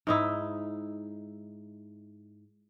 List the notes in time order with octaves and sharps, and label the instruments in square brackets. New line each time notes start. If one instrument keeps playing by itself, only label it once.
[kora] G#2 D#4 E4